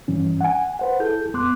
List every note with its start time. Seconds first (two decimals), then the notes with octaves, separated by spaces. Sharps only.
0.08 G2 E3 C#4
0.41 F#5 G#5
0.79 B4 C5 F#5
1.00 E4 G#4 A4 G6
1.34 F#2 B3 C6 D6 F#6